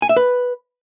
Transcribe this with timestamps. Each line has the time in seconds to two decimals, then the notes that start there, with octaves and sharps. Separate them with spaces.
0.02 G#5
0.09 E5
0.17 B4